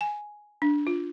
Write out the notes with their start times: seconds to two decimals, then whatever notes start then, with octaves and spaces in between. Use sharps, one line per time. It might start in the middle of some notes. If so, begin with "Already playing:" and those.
0.01 G#5
0.62 D4
0.87 F4